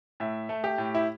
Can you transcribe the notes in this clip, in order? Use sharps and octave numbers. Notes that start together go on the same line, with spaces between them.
A2 E5
A3
G4
A2
E4